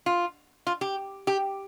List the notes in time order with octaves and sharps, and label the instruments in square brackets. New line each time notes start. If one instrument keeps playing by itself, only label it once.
[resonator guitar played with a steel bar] F4
F4
G4
G4